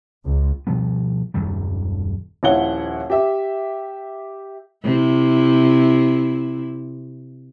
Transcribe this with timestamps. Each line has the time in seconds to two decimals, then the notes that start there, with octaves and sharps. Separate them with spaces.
0.25 C#2
0.67 B2 F3 G3 B3
1.34 D#1 F#2 D#3 G3
2.43 D#1 A#1 E4 C#5 F#5 G7
3.10 G4 E5
4.83 C3 E4